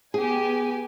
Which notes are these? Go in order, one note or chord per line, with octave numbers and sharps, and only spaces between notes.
B3 G4 G#4 G#5